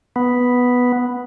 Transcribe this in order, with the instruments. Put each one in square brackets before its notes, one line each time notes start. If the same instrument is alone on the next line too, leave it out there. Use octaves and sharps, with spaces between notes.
[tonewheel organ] B3